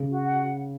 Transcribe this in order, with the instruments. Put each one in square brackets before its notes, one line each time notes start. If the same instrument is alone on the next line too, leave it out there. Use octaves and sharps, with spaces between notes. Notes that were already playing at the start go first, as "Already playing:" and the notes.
Already playing: [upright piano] C#3
[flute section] F#4
F#5